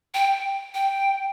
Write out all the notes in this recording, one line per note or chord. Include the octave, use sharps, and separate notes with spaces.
G5
G5